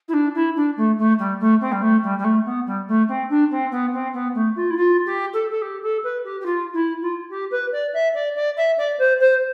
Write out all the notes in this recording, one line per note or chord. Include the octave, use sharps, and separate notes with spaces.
E4
D4
E4
D4
A3
A3
G3
A3
C4
G3
A3
G3
G3
A3
B3
G3
A3
C4
D4
C4
B3
C4
B3
A3
F4
E4
F4
G4
A4
A4
G4
A4
B4
G4
G4
F4
E4
F4
G4
B4
D5
E5
D5
D5
E5
D5
C5
C5